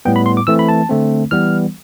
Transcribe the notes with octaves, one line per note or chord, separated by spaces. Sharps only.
A2 G3 B3 G5
B5
C6
D6
E3 A3 C4 E6
B5
A5
D3 A3 C4
E3 G3 B3 F6